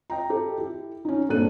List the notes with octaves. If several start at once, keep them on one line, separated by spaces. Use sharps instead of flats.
D#5 G5 A#5
G4 A4
E4 G4
C#4 D#4
G2 A#2 C4 A4 F#6 D#7